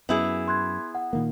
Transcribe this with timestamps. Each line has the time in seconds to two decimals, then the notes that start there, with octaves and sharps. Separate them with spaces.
0.09 F#2 B3 E4 G#4
0.48 C6 F#6 G#6
0.95 F#5
1.13 A#2 D#3 A#3